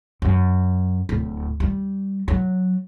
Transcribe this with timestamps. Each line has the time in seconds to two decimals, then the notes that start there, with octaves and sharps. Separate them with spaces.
0.22 F#2
1.09 D1
1.60 G3
2.28 F#3